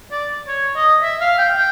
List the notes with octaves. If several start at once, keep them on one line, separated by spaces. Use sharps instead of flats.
D5
C#5
D#5
E5
F5
G5
G5